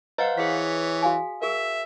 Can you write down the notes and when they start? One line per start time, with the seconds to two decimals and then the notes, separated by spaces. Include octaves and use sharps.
0.18 B4 C5 D#5 F5 F#5 A#5
0.37 E3 G#4 C#5 B6
1.02 F#4 F5 G#5
1.42 G#4 A#4 E5